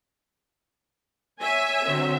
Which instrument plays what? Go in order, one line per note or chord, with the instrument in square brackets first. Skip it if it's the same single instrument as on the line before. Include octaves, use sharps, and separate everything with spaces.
[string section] C#5 G#5 [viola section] E5
[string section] D3 F#3 C4